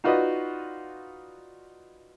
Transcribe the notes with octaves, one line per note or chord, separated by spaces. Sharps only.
D#4 F4 F#4 B4 D5 D#5